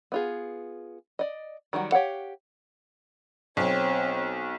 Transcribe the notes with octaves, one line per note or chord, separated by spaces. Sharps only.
B3 F4 G#4
D5 D#5
D#3 F#3 G3 F#4
G4 C#5 F5 F#5
B1 C4 C#5